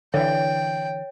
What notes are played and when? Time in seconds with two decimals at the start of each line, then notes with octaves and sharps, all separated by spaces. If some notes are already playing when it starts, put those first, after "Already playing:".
0.14 D3 E3 C#5 G5